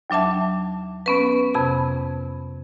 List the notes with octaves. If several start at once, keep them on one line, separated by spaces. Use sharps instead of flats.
D#2 F#3 D4 E5 A5
B3 C#4 B4
F2 C3 B5